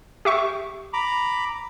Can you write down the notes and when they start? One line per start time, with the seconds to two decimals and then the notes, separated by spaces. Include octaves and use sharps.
0.25 G4 E5 C#6
0.93 A#5 B5 D6